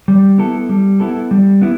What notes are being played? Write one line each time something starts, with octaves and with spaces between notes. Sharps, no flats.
G3
B3 E4 A4
G3
B3 E4 A4
G3
B3 E4